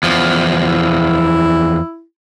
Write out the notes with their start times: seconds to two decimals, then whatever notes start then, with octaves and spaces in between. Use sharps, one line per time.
0.03 E2 F3
0.67 E4